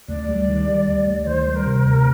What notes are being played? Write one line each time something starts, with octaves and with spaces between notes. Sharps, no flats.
D2 D5
G3
D#3
G3
D2
D2
D#3 C5
G3
A#4
C3
D2